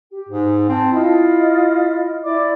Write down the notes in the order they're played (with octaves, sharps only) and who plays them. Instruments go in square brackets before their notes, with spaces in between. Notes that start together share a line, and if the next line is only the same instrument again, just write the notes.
[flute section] G4
[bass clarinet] G#2 [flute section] G#4
[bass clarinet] C4 [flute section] A5
[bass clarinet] E4 [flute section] F4 D#5
[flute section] E4 D5 D6